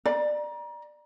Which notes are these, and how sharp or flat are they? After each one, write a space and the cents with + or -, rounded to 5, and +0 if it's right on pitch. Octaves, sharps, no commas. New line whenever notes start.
D5 +20 A#5 +30